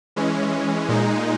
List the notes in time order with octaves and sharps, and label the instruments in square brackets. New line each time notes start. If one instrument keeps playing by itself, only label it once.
[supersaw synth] E3 G#3 C#4
A#2 G#3 D#4